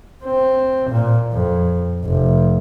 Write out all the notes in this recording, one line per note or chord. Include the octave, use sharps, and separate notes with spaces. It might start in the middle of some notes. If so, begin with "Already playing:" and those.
C4
A#2
F2
F1